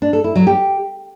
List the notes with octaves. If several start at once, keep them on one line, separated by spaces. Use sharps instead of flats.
D4
A4
E4
F#3
G4